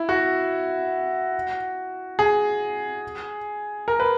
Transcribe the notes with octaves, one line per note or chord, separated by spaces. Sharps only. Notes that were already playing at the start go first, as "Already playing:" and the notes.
Already playing: E4
F#4
G#4
A#4
B4